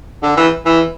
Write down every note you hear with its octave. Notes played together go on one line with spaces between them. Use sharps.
D3
E3
E3